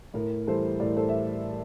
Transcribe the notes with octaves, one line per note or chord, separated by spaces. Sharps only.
A2 A#4
E3 G3 A4 C5
A2 A#4 D5
A4 C5
E5